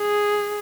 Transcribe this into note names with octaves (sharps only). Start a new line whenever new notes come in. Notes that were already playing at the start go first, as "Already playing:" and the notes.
Already playing: G#4